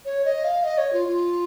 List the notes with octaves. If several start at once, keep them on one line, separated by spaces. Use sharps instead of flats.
C#5
D#5
F5
D#5
C#5
F4
F4